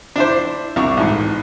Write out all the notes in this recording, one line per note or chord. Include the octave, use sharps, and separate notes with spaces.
D4 E4 C5
C2 D4 C#6
A1 G#2